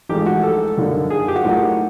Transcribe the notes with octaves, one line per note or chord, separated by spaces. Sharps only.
A1 G#2 F3 G#3 G4
F#4
A4
F#2 D3 G3 A#3 D#4
G#4
G4
F#4
A2 F#3 A#3 D#4 F4
F#4